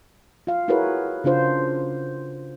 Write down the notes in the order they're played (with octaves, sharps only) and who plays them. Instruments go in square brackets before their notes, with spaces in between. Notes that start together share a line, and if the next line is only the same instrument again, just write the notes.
[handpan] F4 F5
E4 F#4 G#4 A#4 B4 C#5
C#3 D4 F4 C5